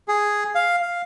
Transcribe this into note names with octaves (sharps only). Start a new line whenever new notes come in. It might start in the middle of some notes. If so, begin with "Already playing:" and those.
G#4
F5
F5